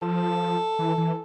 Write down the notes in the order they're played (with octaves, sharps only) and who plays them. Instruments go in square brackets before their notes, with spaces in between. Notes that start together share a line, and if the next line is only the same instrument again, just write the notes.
[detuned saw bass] F3 [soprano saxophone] A4
[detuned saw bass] E3
E3